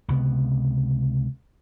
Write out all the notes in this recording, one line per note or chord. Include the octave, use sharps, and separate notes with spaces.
C#2 C3 B3